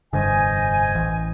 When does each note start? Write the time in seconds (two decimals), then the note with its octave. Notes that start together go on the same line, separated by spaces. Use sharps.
0.13 F1 G2 D3 C5 D#5 G#5
0.95 A1 E3